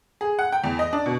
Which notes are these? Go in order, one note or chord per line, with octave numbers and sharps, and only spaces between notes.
G#4
F#5
G5
E2
D#5
D4
B2